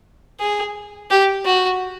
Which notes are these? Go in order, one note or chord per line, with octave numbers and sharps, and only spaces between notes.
G#4
G4
F#4